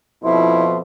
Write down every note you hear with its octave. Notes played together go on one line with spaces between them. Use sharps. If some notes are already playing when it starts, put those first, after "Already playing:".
F2 B2 F3 E4 E5 C6